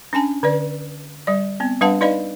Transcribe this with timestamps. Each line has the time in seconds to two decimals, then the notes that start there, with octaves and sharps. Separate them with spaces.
0.13 C#4 D4 G#5 A5
0.43 D3 B4 D5
1.27 G3 D5
1.60 B3 C4
1.81 G3 D4 B4 F5 F#5 A5
2.01 D#4 B4 D5 D#5 F5 B5